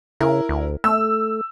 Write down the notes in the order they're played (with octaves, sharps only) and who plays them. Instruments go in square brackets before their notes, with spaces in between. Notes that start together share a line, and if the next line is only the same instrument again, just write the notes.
[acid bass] C#3 [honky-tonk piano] E4 A#4
[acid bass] D2
[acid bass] A3 [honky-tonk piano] E6